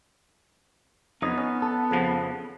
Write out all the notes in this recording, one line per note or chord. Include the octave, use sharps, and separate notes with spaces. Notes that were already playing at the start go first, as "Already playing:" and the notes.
F2 B3 D#4 C#5 D#5
C#4
A4
F2 C#3 F3